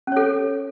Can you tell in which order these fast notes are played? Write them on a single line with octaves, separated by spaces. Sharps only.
C#4 C#5 A4